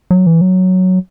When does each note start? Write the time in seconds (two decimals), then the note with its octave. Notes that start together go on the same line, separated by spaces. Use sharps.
0.11 F#3
0.27 E3
0.41 F#3